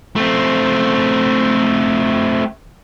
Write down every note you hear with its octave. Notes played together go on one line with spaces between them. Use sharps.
A3 C4